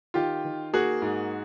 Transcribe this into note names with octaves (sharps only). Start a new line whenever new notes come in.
D#3 F4 G4
D#3
A#3 F#4 G#4
G#2